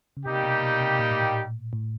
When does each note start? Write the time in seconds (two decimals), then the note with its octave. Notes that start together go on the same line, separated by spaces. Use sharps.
0.17 C#3
0.25 C3 G3 A#3 D#4 G4
0.44 B2
0.62 B2
0.81 C3
0.99 A#2
1.11 A2
1.23 A#2
1.73 A2